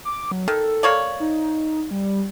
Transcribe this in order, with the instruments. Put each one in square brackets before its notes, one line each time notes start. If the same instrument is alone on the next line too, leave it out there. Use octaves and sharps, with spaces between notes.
[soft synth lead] D6
F#3
[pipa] D#3 [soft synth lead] A4
[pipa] A#3 C#5 D5
[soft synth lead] D#4
G3